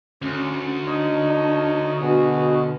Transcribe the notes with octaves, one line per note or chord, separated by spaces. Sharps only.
D2 C#4
D4 D#4 C#5 D#5
B2 D4 F#4 G#4